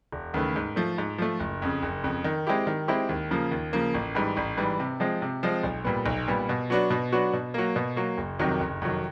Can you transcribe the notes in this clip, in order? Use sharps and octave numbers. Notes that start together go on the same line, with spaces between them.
E1
D#2 C#3 E3 A3
G#2
F3 A3
G#2
F3 A3
F#1
F2 C#3
F#1
F2 C#3
D#3
G#3 C4 E4 G4
D#3
G#3 C4 E4 G4
D#2
C#3 F3 A#3
D#2
C#3 F3 A#3
A1
G#2 E3 G3
A1
G#2 E3 G3
C3
F3 G#3 C4
C3
F3 G#3 C4
B1
A#2 G3 B3
B1
A#2 G3 B3
B2
F#3 B3 D4 F#4
B2
F#3 B3 D4 F#4
B2
F#3 A#3
B2
F#3 A#3
F#1
F2 C3 D#3 F#3
F#1
F2 C3 D#3 F#3